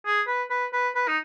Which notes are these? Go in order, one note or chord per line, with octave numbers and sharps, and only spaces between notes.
G#4
B4
B4
B4
B4
D#4